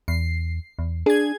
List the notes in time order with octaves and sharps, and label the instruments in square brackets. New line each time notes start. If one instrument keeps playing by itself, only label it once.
[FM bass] E2 [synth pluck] C7
[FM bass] E2
[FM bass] D4 [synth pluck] G#4 G#6